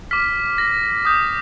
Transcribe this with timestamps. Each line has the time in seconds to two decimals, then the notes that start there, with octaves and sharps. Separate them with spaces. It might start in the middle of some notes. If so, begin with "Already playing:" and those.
0.11 D6 F6 B6
0.58 A#6
1.05 D#6 G6